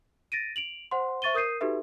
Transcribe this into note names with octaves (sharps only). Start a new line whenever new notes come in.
A6 A#6 D7 D#7
D7 F7 F#7
C5 F#5 C6
C5 E5 C#6 A6 D#7 G7
A#4 D#6 G6 C7 D#7
D#4 F#4 G4 A4 B4 E5